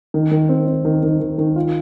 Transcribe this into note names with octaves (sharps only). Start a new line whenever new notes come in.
D#3
D#3
C4
C4
D#3
D#3
D#3
D#3
F4